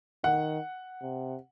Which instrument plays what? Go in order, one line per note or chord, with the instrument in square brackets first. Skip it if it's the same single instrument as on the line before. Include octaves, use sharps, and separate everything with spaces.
[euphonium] D#3 [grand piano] F#5
[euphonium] C3